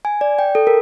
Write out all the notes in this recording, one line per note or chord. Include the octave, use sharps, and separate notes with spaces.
G#5
D5
G5
A4
A#4